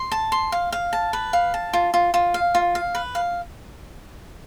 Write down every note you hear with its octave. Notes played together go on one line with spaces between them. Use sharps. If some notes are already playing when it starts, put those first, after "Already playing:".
Already playing: C6
A5
C6
F5
F5
A5
B4
F5
A5
F4
F4
F4
F5
F4
F5
B4
F5